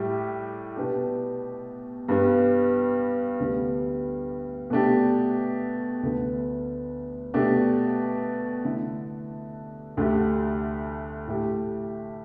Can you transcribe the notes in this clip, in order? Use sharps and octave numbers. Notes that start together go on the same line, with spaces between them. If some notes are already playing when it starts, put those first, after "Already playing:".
Already playing: A2 G3 G4
B2 B3 D4 G4
G2 G3 B3
D2 D3 G3 B3
B2 A3 D4 G4
D2 D3 B3
B2 A3 D4 G4
D3 A3 E4
D2 D3 A3 G4
A2 A3 G4